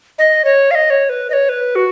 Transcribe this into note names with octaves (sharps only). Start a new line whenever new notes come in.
D#5
C#5
F5
D#5
C#5
B4
D#5
C#5
B4
F#4